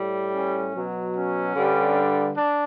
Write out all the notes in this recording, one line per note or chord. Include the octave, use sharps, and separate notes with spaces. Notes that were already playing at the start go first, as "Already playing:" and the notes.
Already playing: A2 G3
C#4
B2 F#3
C#4
G2 D3 G3
D4